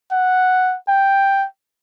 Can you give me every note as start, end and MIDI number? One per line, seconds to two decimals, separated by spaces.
0.12 0.76 78
0.88 1.46 79